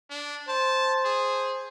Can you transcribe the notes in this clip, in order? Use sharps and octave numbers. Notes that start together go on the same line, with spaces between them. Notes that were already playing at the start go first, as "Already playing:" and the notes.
D4
C5 A5
G#4